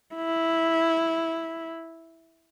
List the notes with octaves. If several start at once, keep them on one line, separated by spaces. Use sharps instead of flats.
E4